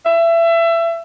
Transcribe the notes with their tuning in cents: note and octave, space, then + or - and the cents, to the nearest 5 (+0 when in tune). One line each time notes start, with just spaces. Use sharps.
E5 +25